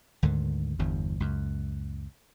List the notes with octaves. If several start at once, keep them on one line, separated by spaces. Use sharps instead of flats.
D2 G#2 D3 D#3
G1 E2 G2
C#2 F#2